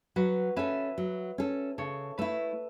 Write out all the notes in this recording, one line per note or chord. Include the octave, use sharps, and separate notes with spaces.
F#3 F#4 B4
C#4 A4 B4 E5
F#3
C#4 A4
C#3 A4 C#5
A3 E4 B4 E5